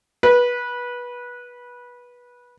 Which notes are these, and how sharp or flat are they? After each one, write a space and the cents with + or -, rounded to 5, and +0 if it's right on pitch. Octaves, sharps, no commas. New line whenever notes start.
B4 -20